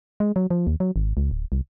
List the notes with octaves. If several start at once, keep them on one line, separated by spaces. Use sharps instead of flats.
G#3
F#3
F3
D#2
F#3
G#1
C#2
D1
C2